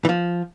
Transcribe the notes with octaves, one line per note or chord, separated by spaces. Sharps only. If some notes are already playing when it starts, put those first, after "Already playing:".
E3
F3